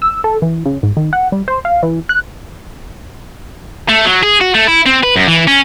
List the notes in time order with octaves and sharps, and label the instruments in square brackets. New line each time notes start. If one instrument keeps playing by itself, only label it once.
[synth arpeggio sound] E6
A4
E3
C#3
G#2
D#3
F#5
G3
C5
F5
E3
F#6
[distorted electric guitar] A3
F#3
G#4
F#4
A3
E4
C4
B4
F#2
E3
C#4